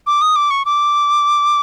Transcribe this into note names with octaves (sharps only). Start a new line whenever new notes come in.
D6
D#6
D6
C#6
D6